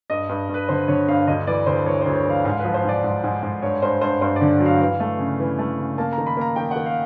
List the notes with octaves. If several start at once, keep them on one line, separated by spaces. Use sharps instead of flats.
G2 D#5
G2
G2
B4
D3 C5
D3 C#5
G2 F5
D2 D#5
E3 D5
D2 C5
E3 C#5
D2 C5
C#5
E3 F5
G#2 F5
B4
F3
C5
G#2 D5
G#2
G#2
G#2
G2 C#5
G2 C5
G2 C5
G2 C5
D5
D3
F#3
F5
E3
A3
C#3
E3
A3
C#3
A#3 A5
A#5
D#3
B5
A#3 A#5
D#3 G5
D#3 F#5
F5